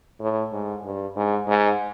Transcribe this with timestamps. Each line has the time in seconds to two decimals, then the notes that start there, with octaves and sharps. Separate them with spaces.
0.20 A2
0.52 G#2
0.84 G2
1.16 G#2
1.48 G#2